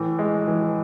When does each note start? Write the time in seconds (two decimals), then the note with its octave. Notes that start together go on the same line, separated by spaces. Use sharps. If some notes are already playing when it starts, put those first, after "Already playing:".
Already playing: A2 E3
0.19 G#3
0.48 E3